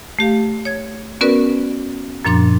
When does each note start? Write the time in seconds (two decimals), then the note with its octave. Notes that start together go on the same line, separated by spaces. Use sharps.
0.19 A3 G4 F5
0.65 C#5 G#6
1.21 B3 C#4 F#4 A#4 B4 D5
2.25 F#2 A#2 F3 D4 C6 A6